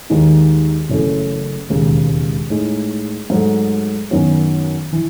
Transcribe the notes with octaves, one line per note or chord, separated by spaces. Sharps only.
D#2 D#3 G#3 D#4
F#1 F#2 C#3 E3 A3
E1 D#2 C#3 G#3
A2 G#3 D#4
G#2 F#3 A3
F#2 D#3 F#3 B3
E3